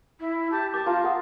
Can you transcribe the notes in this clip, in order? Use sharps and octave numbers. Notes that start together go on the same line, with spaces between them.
E4
G4 A5
G4 A5 D6
F4 F5 A#5
G#4 F#5 D#6